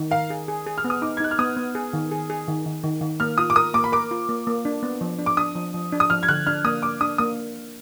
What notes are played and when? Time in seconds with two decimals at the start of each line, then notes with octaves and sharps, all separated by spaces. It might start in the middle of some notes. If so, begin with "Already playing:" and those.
Already playing: D#3
0.11 A#4 F5
0.30 G#4
0.48 G#4
0.66 G#4
0.78 F6
0.84 B3
0.90 D#6
1.02 D#4 D6
1.17 G#6
1.20 D#4 F#6
1.31 F6
1.39 B3 D#6
1.57 B3
1.75 G#4
1.93 D#3
2.11 G#4
2.30 G#4
2.48 D#3
2.66 D#3
2.83 D#3
3.01 D#3
3.20 A#3 F6
3.38 F4 D#6
3.50 D6
3.56 A#4 D#6
3.74 A#3 D6
3.84 B5
3.92 A#4 D6
4.11 F4
4.29 A#3
4.47 A#3
4.65 D4
4.83 B3
5.01 F3
5.19 D4
5.26 D6
5.37 D4 D#6
5.55 F3
5.74 F3
5.93 D4
6.00 D#6
6.10 F3 F6
6.23 G#6
6.29 D3 F#6
6.47 D4 F6
6.65 A#3 D#6
6.82 A#3 D6
7.01 D4 D#6
7.18 A#3 D#6